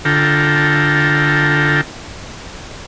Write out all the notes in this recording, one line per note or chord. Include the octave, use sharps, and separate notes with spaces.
D3 F4 A4 G5 A#5